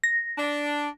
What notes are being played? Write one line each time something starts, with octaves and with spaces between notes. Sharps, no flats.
A#6
D4